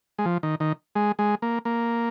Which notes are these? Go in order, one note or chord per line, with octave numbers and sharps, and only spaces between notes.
G#3
F3
D#3
D#3
G#3
G#3
A#3
A#3